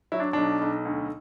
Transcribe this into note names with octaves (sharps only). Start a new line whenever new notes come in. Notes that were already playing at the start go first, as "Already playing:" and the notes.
F#3 E4
D4
B1 D4
B1
D2